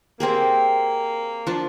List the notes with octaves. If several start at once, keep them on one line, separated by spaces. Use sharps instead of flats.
A#3 C4 G4 G#4
F3 D4